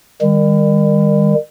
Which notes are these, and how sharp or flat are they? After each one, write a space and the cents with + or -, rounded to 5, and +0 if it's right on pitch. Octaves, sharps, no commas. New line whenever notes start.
D#3 +0 G3 +45